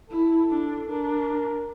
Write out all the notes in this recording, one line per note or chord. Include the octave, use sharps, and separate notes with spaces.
E4 A4
D4
D4 A#4